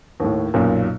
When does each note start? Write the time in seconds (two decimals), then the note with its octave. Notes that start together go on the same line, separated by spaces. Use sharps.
0.20 D#2 A2
0.54 B1 F#2 A#2